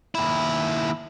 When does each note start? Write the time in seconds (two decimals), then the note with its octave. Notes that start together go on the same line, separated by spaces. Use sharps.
0.15 D#2 E4